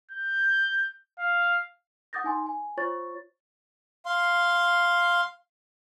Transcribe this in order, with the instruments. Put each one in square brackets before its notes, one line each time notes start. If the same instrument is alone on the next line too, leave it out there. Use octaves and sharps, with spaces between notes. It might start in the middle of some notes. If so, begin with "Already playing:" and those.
[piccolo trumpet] G6
F5
[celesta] F#5 D6 D#6 G6 A6 A#6
D#4 G#5 C6
G#5
F4 C5 C#5 C#6 A6
[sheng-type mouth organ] F5 C6